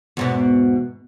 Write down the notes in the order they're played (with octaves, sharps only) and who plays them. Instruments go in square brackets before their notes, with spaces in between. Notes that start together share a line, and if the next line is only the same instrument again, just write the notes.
[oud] E2 G#2 B2